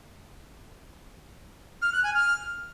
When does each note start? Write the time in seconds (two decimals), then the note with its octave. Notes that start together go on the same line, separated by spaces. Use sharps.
1.82 F6
1.93 F#6
2.04 G#5
2.14 F6